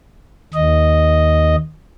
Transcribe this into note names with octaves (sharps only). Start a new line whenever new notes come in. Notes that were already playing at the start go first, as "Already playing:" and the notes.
D#2 D#5